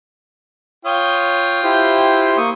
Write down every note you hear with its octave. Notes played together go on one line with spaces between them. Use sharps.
F4 C#5 G5 D#6
E4 G4 C5
A#3 C#6 D#6